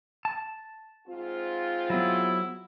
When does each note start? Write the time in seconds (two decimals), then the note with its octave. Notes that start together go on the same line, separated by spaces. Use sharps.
0.25 A5
1.08 G#2 C4 F4
1.90 F#3 B3 E4